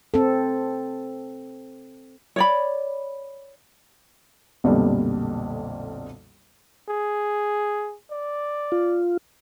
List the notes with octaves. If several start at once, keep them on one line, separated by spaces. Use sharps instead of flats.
C4 A4
C#5 D5 B5
B1 F2 A#2 D3 G3
G#4
D5
F4